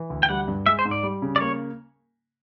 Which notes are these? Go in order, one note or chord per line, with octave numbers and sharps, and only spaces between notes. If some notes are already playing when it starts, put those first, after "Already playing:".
Already playing: E3
D2
G5
G3 F#5
G2
G#3 E5
C5
G#2
D5
G3
C#3
D5
A#3 C#5